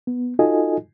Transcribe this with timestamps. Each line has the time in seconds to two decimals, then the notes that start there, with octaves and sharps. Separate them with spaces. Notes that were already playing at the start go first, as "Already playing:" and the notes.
0.07 B3
0.39 D#4 F4 F#4 A4 D#5 G#5